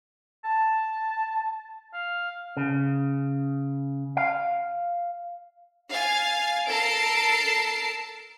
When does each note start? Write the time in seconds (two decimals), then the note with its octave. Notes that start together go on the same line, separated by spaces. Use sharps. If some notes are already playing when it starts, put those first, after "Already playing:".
0.45 A5
1.93 F5
2.57 C#3
4.17 F5
5.91 F5 G#5 A6
6.68 A4 A#4 A5 C7 D7